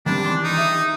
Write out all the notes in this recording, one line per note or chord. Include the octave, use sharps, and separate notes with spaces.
D#3 G3 C4 D4
D#3 E3 C6
D#4
G4 E5